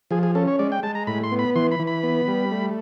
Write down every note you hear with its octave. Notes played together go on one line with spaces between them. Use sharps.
F3 G#4
G#4
C#4 A4
C#5
G#3 D5
G5
G#3 A5
A#5
A2 B5
C6
B3
B5
E3 C6
B5
E3
B5
B3
G3
A3